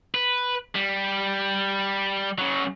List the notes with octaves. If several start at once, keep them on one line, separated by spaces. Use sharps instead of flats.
B4
G3
C#3 F#3